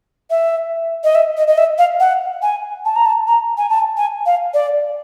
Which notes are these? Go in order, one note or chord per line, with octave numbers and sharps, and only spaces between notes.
E5
D#5
E5
D#5
D#5
E5
F5
F#5
G#5
A5
A#5
A5
A#5
G#5
A5
G#5
F5
D5